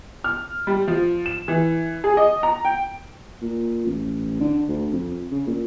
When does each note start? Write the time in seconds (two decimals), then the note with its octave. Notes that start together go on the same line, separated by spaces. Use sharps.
0.24 F6
0.67 G3
0.88 F3
1.26 E7
1.48 E3
2.04 G#4
2.17 D#5
2.43 A#5
2.65 G5
3.42 A#2
3.86 A1
4.40 D3
4.68 D2
4.93 F2
5.32 C#3
5.47 A#2